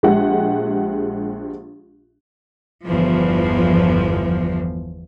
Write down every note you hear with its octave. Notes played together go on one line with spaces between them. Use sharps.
A#1 G#3 G4 F#5
G1 E2 F3